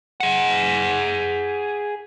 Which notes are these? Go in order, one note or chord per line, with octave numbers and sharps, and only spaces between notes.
G#4 F#5